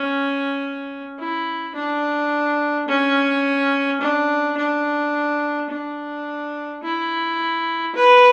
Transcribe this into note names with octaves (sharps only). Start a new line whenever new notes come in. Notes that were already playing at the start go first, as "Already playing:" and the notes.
Already playing: C#4
E4
D4
C#4
D4
D4
D4
E4
B4